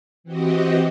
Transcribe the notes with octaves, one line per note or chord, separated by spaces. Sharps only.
E3 C4 F#4 G4 D#5